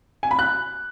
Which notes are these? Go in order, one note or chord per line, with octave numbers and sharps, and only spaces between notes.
G#5
B5
F#6